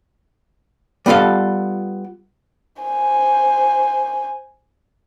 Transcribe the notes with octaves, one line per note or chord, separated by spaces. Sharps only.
G3 B3 F4 A4 F5
C5 G#5